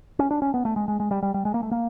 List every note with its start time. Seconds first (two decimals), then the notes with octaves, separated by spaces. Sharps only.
0.19 C#4
0.31 D4
0.42 C#4
0.54 B3
0.65 A3
0.76 G#3
0.88 G#3
1.00 G#3
1.11 G3
1.22 G3
1.34 G3
1.45 G#3
1.54 A#3
1.63 A3
1.71 A#3